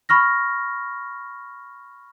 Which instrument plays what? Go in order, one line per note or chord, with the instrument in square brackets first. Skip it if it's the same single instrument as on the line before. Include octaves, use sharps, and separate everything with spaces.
[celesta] B5 C#6 F6 A#6